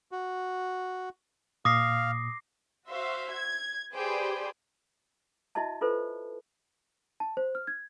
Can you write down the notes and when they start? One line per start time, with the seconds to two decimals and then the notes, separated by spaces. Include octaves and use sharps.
0.12 F#4
1.65 A#2 F5 D6 D#6 A#6 C7
2.89 F#4 C5 E5 F5
3.32 G#6
3.94 G4 G#4 B4 C5 D5 G5
5.55 E4 F#4 D#5 E5 A5
5.81 F4 A4 B4 C5
7.20 A5
7.37 C5
7.55 F6
7.67 G#6